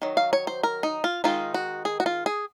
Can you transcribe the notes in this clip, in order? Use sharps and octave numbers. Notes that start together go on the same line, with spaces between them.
D#3 F#3
F5
C#5
C5
A#4
D#4
F4
D#3 G#3 D#4 F4
F#4
G#4
F#4
F4
G#4